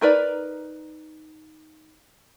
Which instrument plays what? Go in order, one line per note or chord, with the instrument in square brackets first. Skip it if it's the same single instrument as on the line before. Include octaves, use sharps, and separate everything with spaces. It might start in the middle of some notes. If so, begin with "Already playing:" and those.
[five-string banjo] D#4 A#4 B4 D5